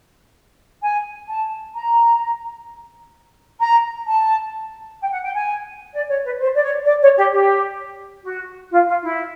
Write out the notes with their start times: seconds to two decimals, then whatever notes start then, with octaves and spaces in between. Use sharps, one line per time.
0.82 G#5
1.28 A5
1.74 A#5
3.60 A#5
4.06 A5
5.00 G5
5.11 F#5
5.23 G5
5.35 G#5
5.93 D5
6.08 C#5
6.24 B4
6.39 C5
6.54 D5
6.62 C#5
6.85 D5
7.02 C#5
7.16 G4
7.31 G4
8.24 F#4
8.71 F4
8.87 F4
9.02 E4